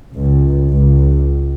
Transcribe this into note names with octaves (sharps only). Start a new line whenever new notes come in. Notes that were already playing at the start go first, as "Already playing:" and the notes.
C#2
C#2